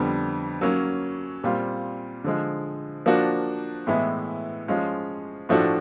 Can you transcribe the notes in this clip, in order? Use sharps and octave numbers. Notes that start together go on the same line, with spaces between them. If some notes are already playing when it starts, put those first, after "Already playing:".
Already playing: F2 D3 G3 B3
F#3 A#3 C#4
A#2 G3 C4 F4
D3 F3 G#3
F3 A#3 D4 F#4
A2 E3 G#3 B3 E4
F3 G#3 C#4 F4
A2 F3 A3 D4 F#4